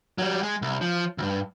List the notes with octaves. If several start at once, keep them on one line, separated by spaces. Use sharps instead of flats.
F#3 G3
G#3
C2
F3
D2 G2